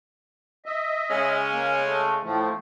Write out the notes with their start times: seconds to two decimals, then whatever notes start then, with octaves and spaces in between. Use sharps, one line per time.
0.65 D#5 E5
1.10 C#3 G#3 C#4
1.52 A#3
1.85 A3
2.23 A2 F3 A3